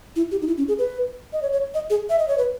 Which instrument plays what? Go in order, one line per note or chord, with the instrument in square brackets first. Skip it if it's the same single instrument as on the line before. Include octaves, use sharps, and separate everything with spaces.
[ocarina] E4
G4
D#4
E4
C#4
G#4
B4
D#5
C#5
C#5
D#5
G#4
E5
D#5
C#5
B4